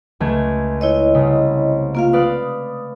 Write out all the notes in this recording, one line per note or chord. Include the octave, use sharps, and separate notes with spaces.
C#2 A3 G#6
E4 C#5 D#5
C2 C#3
A#3 F4 F5
B4 D5 F5 D#6